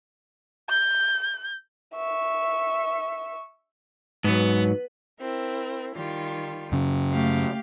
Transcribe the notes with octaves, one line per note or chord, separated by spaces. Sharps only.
G6
E5 C#6
G#2 F#3 B3
C4 E4 A#4
D#3 G3 F4
F#2 C#3
A3 G4 F5